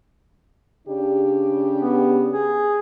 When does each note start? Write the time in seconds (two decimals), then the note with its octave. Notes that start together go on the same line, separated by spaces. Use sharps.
0.88 C#3 D4 G4
1.81 B3
2.34 G#4